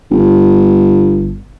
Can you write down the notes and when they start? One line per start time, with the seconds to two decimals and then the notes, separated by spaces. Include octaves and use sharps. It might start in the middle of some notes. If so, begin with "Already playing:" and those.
0.11 G1